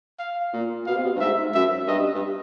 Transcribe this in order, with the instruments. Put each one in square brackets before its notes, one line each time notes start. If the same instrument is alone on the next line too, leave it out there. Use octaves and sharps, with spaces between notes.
[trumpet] F5
[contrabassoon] A#2
[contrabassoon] B2 [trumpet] F5
[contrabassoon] C3
B2
G2
[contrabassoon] G#2 [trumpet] E5
[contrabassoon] F#2 [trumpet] E5
[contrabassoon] G2 [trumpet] D#5
[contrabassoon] G2